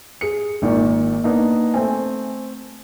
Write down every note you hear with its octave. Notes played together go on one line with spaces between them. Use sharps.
G#4 C#7
G#1 A#2 D#3 A#3
A#3 B3 D4 D#4
A3 C4 G#5